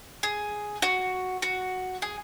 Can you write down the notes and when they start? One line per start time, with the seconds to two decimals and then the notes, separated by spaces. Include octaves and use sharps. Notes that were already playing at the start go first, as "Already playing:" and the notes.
0.23 G#4
0.82 F#4
1.42 F#4
2.02 G#4